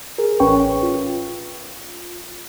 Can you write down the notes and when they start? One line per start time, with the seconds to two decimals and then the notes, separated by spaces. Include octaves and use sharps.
0.18 G#4 A#4
0.40 A1 C#4 B4 C#5 G5 C#6
0.83 F4